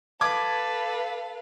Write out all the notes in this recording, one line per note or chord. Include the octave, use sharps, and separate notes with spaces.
A4 B4 F5 A5 D6 G#6